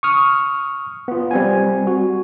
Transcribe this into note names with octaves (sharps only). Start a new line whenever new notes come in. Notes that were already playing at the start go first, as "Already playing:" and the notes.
C#6 D#6 F6
B3 F4
G3 C4 G#5
F#4